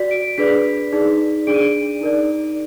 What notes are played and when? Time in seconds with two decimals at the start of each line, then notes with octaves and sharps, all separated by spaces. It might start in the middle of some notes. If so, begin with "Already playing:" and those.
Already playing: F#4 D5 B6
0.11 D7
0.38 D4 G#4 B4 D5 B6
0.93 D#4 G#4 D5
1.47 D4 G#4 D5 D7
1.54 D#7
1.61 D7
2.01 D#4 A#4 D5